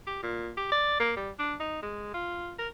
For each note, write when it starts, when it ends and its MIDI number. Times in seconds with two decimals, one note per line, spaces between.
0.07 0.19 67
0.23 0.50 46
0.57 0.69 67
0.72 0.99 74
1.00 1.13 58
1.16 1.30 55
1.39 1.54 62
1.60 1.82 63
1.82 2.13 56
2.14 2.53 65
2.59 2.68 70